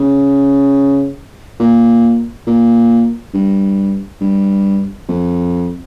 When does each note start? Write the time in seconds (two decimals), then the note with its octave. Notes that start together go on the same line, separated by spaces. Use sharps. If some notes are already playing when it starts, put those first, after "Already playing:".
Already playing: C#3
1.60 A#2
2.47 A#2
3.34 G2
4.21 G2
5.09 F2